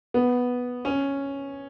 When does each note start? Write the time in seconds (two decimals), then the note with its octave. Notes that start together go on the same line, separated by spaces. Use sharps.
0.14 B3
0.85 C#4